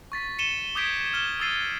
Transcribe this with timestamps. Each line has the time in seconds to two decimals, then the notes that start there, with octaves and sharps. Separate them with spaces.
0.12 C#6 A6 B6
0.39 C#7 D#7 E7 G7
0.75 D6 D#6 G6 G#6 B6 D7
1.13 F6 E7 G7
1.40 D#6 E6 A6 C7 D#7